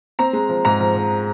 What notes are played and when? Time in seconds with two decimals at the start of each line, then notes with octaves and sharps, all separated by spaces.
0.19 C4 A#5
0.33 G#3
0.49 F3
0.65 G#2 A#5
0.80 F3
0.96 F3